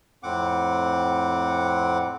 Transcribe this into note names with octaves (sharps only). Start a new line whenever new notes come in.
F2 A2 C4 F#5 D6